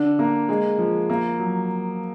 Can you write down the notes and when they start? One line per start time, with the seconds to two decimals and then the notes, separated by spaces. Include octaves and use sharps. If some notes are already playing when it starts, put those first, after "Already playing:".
Already playing: D3 D4
0.19 A#3
0.49 G#3
0.78 F3
1.10 A#3
1.39 F#3